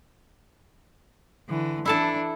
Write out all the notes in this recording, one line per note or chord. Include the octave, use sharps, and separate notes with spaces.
D3 E3
E3 D4 E4 A4 A5